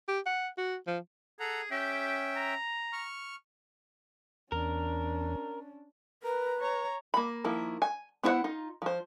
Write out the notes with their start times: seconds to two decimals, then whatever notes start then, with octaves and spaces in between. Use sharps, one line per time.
0.09 G4
0.26 F#5
0.58 F#4
0.87 F3
1.40 G#4 A4 F#5 A#5
1.71 C#4 G4 E5 G5
2.36 A#5
2.93 C#6 F6
4.52 E2 C#4 D4 A#4
6.23 A#4 B4 A#5
6.60 C#5 A#5
7.14 A#3 B5
7.44 D#3 F3 A#3 E4
7.82 G#5
8.23 B3 E4 B4 C5 F#5
8.44 D#4 F4
8.82 F3 C5